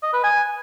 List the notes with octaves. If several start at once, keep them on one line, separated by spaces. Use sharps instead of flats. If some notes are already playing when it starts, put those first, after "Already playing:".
D#5
B4
G#5